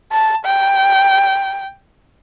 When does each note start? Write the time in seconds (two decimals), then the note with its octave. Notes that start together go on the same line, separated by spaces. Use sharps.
0.12 A5
0.45 G5